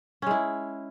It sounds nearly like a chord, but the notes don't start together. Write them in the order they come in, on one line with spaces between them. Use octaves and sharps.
C#4 G#3 E4